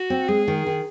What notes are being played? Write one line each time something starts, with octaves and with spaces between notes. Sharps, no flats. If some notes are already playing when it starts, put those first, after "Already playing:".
Already playing: F#4
C4
G#3 G#4
D#3
D#3